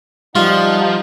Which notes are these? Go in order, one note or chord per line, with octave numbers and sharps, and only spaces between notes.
F3 G3 D#4 F4 F#5